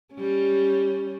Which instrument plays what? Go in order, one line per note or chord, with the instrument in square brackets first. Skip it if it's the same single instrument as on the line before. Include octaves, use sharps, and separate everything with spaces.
[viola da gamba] G3 C#4